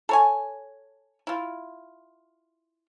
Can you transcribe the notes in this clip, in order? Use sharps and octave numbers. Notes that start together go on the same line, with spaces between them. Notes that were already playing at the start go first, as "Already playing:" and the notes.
A4 C#5 G#5
E4 F4